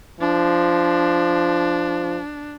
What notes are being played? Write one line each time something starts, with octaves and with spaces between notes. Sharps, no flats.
F3 D4